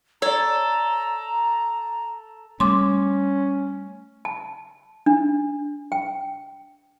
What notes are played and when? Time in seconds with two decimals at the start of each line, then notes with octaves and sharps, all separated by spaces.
0.22 A4 C#5 D5 A#5
2.60 G3 A3 C#4 C6 D6
4.25 A5
5.06 D4
5.92 G5